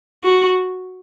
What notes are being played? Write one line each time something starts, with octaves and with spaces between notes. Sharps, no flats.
F#4